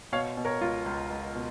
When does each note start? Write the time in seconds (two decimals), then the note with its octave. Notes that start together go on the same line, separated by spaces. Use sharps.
0.12 B2 C#5 F5
0.37 B2
0.45 A#4 C#5
0.61 C#2 F4
0.86 C#2
1.10 C#2
1.35 B2